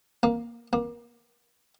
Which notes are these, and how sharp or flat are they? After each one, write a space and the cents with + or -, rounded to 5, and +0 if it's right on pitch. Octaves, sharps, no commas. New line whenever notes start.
A#3 +10
A#3 +30